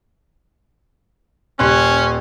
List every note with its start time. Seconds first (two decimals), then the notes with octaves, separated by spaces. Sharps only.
1.59 D#1 C#4 C6 F#6